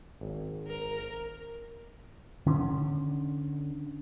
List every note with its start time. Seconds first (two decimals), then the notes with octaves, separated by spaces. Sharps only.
0.21 G#1
0.67 A#4
2.46 D3 C#4